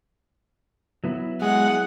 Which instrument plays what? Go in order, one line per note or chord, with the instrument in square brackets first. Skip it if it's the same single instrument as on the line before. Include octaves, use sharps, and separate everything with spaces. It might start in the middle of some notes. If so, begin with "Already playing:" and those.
[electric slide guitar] F#3 B3 E4
[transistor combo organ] G#3 [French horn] G#4 [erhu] F#5